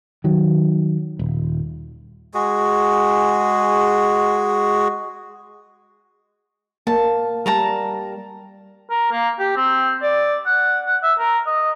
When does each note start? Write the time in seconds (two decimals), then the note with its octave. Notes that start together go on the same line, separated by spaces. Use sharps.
0.24 D#3 F#3
1.19 D#1
2.34 G#3 F#4 G#4
6.87 A#3 A5
7.46 G3 A#4 A5 A#5
8.90 A#4
9.12 A#3
9.39 G4
9.56 C4
10.02 D5
10.46 F#5
10.86 F#5
11.03 E5
11.19 A#4
11.46 D#5